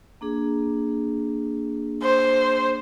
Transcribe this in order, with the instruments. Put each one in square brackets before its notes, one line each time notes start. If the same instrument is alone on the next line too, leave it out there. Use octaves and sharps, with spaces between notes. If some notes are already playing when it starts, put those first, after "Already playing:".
[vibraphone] A#3 D4 G#4
[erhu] C5